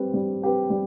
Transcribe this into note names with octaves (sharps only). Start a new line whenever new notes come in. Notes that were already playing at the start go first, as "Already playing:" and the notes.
Already playing: G3 C4 G4 B4
G3
C4 G4 B4
G3